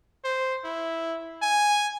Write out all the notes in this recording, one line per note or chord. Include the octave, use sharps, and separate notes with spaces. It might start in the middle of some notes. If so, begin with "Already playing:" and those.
C5
E4
G#5